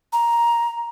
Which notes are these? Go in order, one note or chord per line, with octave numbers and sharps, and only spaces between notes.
A#5